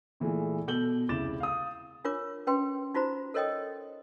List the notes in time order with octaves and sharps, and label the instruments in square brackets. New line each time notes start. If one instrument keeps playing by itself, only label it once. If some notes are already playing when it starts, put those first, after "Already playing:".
[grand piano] A#2 E3 G#3 A3
B2 A4 G6 F#7 G7
F1 C#2 E4 D6 A6 E7
F5 D#6
[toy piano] D4 F4 A#4 C#5 D6
C#4 B4 G5 C6
D#4 F4 F#4 C5 A#5
A4 A#4 C#5 D#5 G5 D#6